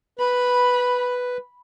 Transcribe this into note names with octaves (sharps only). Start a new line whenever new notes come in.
B4 B5